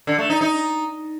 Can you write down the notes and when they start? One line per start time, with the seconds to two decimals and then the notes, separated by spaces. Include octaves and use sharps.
0.07 D3
0.18 A3
0.30 D#4
0.41 D#4